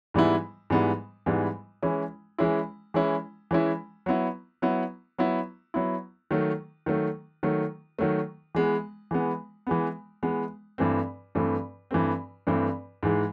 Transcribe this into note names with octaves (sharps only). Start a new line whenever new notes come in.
G#2 E3 G3 B3 E4
G#2 E3 G3 B3 E4
G#2 E3 G3 B3 E4
E3 G#3 C#4 E4
E3 G#3 C#4 E4
E3 G#3 C#4 E4
E3 G#3 C#4 E4
F#3 B3 E4
F#3 B3 E4
F#3 B3 E4
F#3 B3 E4
D#3 F#3 A3
D#3 F#3 A3
D#3 F#3 A3
D#3 F#3 A3
E3 G#3 B3
E3 G#3 B3
E3 G#3 B3
E3 G#3 B3
G2 E3 A3 C4
G2 E3 A3 C4
G2 E3 A3 C4
G2 E3 A3 C4
G#2 E3 G#3